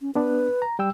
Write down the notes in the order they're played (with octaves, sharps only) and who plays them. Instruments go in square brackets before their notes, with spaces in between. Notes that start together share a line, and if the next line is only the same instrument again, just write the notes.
[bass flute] C#4
[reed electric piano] B3 D4 [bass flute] B4
[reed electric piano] A#5
G3 G5 E6